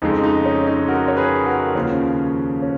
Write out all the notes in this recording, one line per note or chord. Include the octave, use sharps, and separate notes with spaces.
F2 C#3 G#3 D#4
D#4
C#4
D#4
F#4 A#4
C#5
G#4 B4
F#4 A#4
D#2 C#3 F3 C#4
C#4